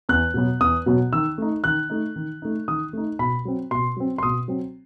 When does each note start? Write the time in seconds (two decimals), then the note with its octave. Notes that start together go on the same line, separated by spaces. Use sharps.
0.09 E2 F#6
0.34 B2 F#3 B3
0.60 E2 D#6
0.86 B2 F#3 B3
1.13 D#3 E6
1.38 A3 D#4
1.64 D#3 F#6
1.90 A3 D#4
2.16 D#3
2.42 A3 D#4
2.68 D#3 D#6
2.93 A3 D#4
3.19 B2 B5
3.45 F#3 C4
3.71 B2 C6
3.96 F#3 C4
4.18 C6
4.23 B2 D#6
4.48 F#3 C4